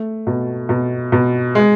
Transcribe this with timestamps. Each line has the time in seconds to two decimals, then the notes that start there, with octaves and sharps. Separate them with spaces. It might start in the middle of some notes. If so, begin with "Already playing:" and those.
Already playing: A3
0.27 B2
0.69 B2
1.12 B2
1.55 G#3